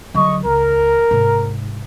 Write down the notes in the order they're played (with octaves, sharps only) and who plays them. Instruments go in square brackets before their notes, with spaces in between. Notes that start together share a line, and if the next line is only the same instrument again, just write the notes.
[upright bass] D3 F#3 [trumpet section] D#5 C#6
[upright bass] C#2 [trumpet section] A#4
[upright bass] G#2 C3